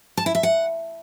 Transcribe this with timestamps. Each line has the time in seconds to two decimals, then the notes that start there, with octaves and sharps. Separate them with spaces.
0.17 A5
0.26 E4
0.35 E5
0.43 F#5